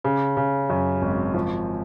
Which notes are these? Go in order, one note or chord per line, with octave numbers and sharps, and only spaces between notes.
C#3
C#3
F#2
G#1
F3